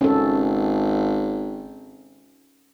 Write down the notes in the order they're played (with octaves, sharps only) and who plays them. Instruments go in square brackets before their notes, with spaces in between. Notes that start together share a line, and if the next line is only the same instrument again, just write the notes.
[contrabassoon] G#1 [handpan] C#4 A4